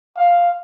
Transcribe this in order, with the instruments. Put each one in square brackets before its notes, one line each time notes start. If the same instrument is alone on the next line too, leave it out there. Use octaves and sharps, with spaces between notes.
[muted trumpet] F5